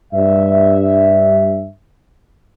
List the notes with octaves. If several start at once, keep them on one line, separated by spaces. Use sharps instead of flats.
G2 E5